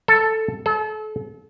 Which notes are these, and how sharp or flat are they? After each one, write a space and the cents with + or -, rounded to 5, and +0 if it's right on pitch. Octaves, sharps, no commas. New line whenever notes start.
A4 +5
A4 -35